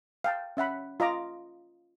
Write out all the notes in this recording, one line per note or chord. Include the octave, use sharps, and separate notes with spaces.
F5 G5 A5
C#4 E5 F#5 B5
F4 D#5 A#5 D6